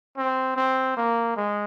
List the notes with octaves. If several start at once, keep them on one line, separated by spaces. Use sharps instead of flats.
C4
C4
A#3
G#3